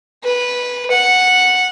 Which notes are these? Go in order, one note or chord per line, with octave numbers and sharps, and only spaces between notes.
B4
F#5